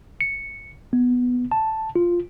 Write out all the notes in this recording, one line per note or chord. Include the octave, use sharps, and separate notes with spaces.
C#7
B3
A5
F4